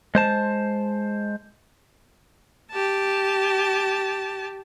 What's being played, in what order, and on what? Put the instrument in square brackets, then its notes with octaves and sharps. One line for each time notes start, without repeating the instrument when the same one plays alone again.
[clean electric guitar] G#3 C5 A5
[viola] G4 A5